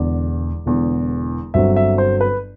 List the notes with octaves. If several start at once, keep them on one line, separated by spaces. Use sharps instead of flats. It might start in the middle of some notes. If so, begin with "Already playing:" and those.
Already playing: E1 E2 D3 D5
E1 E2 D3
G1 G2 F#3 C4 E5
E5
C5
B4